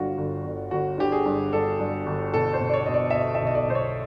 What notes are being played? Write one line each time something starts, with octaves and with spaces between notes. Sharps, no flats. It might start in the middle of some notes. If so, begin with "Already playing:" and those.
Already playing: G1 G2 D3 F4 F#4
G1
G1
G1 F#4
D3 G4
G#4
G2
G2 A4
G2
G1
B2 A4
C5
B2
D5
C#5
B2 D#5
D5
E5
B2 D#5
E5
B1
D#5
D5
B2 C5
C#5